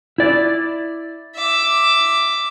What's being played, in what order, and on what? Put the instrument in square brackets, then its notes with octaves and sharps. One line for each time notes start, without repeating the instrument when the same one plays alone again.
[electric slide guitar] E4 D5
[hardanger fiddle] E5 D6